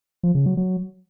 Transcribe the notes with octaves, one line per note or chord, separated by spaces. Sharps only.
F3
C#3
F#3
F#3